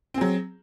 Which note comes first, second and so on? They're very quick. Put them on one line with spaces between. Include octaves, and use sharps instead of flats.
C4 G#4 F#3